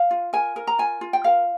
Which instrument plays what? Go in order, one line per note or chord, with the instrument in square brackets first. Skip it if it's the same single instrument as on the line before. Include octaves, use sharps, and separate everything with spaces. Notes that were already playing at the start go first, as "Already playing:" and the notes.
Already playing: [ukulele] F5
F4
A#4 G#5
A#4
A#5
F4 G#5
F4
G5
A#4 F5